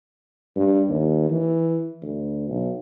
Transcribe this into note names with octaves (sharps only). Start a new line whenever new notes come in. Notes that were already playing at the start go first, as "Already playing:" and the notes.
G2
D#2
E3
D2
B1